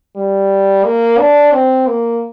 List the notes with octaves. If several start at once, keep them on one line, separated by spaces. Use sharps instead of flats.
G3
A#3
D4
C4
A#3